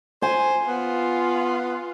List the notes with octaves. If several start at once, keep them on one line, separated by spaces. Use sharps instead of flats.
C5 G#5
B3 F4